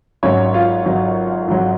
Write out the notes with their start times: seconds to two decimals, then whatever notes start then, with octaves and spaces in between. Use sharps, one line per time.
0.23 G#1 G#2 F#3 C#4 C#5
0.54 F4 F5
0.86 G#1 G#2 F#3
1.48 G#1 G#2 F#3